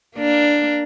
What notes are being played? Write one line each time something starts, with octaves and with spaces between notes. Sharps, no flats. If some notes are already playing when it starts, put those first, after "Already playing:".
A#3 D4